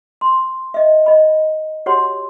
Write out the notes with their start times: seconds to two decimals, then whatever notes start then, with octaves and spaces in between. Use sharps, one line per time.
0.21 C6
0.74 D#5 E5
1.06 D#5 B5
1.86 F#4 G4 C#5 F#5 C6